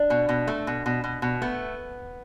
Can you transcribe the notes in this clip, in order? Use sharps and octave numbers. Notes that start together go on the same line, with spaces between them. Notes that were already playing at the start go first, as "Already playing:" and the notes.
Already playing: D4
B2
B2
A3
B2
B2
B2
B2
A3 B3